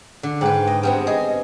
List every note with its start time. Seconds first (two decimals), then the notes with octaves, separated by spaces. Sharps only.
0.23 D3
0.41 G#2 B4 G5
0.67 D#5
0.83 G2 B3 C4
1.07 G#4 D#5